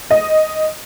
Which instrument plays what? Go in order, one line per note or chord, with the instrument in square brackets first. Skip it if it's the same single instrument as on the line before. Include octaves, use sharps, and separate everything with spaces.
[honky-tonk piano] D#5